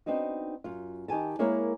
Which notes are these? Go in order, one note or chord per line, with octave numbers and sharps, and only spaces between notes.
B3 C4 D4 D#4 F#4
F#2 F4
D#3 G4 G#5 A5
G#3 A#3 E4 A#4 C#5 F5